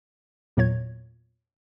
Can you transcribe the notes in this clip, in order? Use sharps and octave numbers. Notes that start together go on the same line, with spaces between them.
E2 A#2 F#3 C#5 G#6